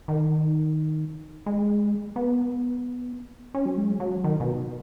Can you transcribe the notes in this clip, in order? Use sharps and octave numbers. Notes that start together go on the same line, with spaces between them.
D#3
G#3
B3
C#4
F#3
G#3
F#3
D#3
B2